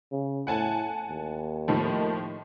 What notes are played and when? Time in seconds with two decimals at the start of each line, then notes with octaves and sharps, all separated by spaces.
0.12 C#3
0.47 A2 F#5 G#5 A5
1.09 D#2
1.68 A2 D#3 F3